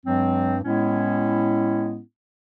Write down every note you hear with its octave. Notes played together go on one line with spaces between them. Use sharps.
G2 F#3 G#3 C4
A2 G#3 B3 C#4 E4